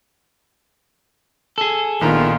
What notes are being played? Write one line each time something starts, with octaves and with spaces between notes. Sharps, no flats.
G#4 A4
A#1 D#3 B3 F4 A#5